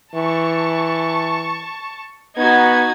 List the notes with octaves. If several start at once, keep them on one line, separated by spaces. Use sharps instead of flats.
E3 A5 C#6
B3 D#4 F#4 G#6